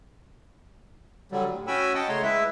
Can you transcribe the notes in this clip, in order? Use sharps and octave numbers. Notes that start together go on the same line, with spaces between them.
D3 F#3 G3
A2
C#4 F#4 G5 G#5 B5 E6
D#5 F#5 G5 A5
C#3 A3 C#5 A#5 C6
G#3 E4 B4 E5